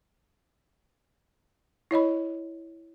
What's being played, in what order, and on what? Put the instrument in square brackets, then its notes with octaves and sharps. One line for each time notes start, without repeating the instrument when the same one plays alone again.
[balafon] E4 C#5 D#5 B5